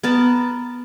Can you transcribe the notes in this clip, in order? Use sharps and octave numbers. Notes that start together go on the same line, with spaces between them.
B3 A#4 A5